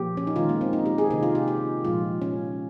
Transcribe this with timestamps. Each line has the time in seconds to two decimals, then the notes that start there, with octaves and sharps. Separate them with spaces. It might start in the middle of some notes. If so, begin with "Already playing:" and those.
Already playing: A#2 F3 A#3 G4
0.17 C#4
0.27 D#4
0.36 D#3 G#3 F4
0.49 A#3
0.61 C4
0.73 D#4
0.86 G4
0.98 G#4
1.11 C3 D#3 A#3 D#4
1.23 F4
1.35 G4
1.48 G4
1.85 A#2 F3 G#3 F4
2.22 C#4